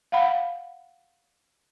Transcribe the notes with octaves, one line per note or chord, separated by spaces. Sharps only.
F5 F#5 B5